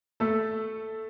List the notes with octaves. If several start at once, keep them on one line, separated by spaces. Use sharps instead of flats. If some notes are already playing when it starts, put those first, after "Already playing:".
A3 A4